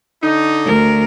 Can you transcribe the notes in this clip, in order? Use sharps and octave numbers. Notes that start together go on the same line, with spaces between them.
D3 D#4
D2 A#4